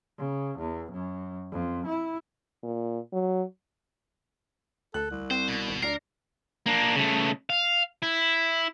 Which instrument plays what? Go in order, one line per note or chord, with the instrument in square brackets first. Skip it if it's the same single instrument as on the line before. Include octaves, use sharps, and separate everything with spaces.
[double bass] C#3
E2
F#2
F2
E4
[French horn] A#2
F#3
[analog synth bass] D2 [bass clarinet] A4 [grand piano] F#6
[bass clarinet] C2
[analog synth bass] C4 [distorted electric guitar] C5
[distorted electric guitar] B2
[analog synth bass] G#1
[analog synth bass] D2 [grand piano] D4 C7 [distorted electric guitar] A#4
[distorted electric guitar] A#3 D4
C#3 A3
F5
E4